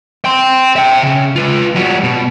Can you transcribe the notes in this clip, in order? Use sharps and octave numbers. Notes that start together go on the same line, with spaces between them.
G5 C6
E5 G5
C#3
F4 B4
G3 F#4
B2